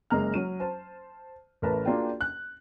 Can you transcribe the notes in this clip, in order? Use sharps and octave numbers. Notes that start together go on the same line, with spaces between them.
F#1 G#3 A#3 A#5 F6
F#3 D#7
C5 A5
A1 A3 A#4 B4 A5
A#3 D4 F4 F#4 G#4 G5
F#6